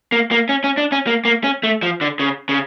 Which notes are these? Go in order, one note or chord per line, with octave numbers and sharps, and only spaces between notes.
A#3
A#3
C#4
C#4
D4
C#4
A#3
A#3
C#4
A3
F3
D3
C#3
C#3